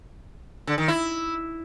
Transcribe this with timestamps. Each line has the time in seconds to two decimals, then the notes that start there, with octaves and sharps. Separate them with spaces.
0.67 D3
0.78 D#3
0.88 E4